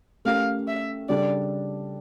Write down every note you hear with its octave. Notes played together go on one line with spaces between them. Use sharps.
A3 C#4 G4 A#4 F5
E5
C#3 G3 D4 A4 D5